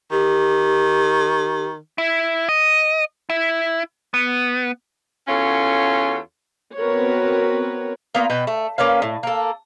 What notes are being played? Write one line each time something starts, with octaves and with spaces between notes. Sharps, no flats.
D#3 G4
E4
D#5
E4
B3
E2 C#4 F4 F#4 A4 C#5
B3 C4 F#4 A#4 B4 C#5
A#3 B3 F4
B2 B4 G5
A3
A#3 C#4 B4 F5
A2
A#3 A4